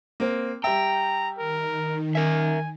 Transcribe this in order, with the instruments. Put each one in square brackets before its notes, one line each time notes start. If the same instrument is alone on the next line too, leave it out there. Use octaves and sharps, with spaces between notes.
[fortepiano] A#3 C4
[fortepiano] G3 E5 [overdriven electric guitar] G5 [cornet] A#5
[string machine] D#3 [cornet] A#4
[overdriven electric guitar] A#4 E5 [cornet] G#5